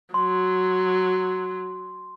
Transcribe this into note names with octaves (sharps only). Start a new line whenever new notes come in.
F#3 C6